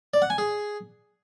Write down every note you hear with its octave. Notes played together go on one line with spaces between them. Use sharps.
D5
F#5
G#5
G#4